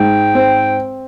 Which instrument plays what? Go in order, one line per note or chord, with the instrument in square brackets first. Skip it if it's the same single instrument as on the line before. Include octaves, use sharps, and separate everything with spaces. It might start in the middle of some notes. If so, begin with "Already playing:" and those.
Already playing: [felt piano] G#2 [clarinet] G5
[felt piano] C4